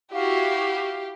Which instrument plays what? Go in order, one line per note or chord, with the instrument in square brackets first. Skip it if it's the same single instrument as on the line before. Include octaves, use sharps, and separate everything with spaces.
[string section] E4 F#4 [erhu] G4 [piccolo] F5